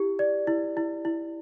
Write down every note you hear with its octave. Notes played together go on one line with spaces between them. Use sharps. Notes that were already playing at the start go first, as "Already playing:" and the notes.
Already playing: E4 G4
D5
E4
E4
E4